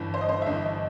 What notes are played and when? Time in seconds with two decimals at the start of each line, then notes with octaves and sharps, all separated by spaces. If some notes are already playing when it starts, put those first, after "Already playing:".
Already playing: G1 G2 E3
0.14 C5
0.21 D#5
0.29 C5
0.42 E5
0.46 G1 G2 E3 D#5